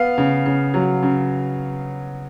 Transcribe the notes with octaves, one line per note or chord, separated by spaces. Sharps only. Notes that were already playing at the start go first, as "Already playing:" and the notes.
Already playing: B3 F5
C#3
C#3
F#3
C#3